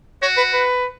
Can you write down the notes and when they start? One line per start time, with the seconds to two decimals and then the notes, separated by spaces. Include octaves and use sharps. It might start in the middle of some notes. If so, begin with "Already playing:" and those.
0.22 F#4 C#5
0.37 B4
0.53 B4